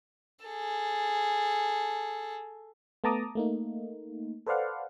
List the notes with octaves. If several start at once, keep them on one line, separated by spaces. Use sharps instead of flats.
G#4 A4
A3 B3 A5 A#5 D6 D#6
A3 A#3 D#4
A4 B4 C5 D5 F5 F#5